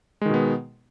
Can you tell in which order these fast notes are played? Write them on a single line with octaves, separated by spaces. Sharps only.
G#3 D#3 B2 B3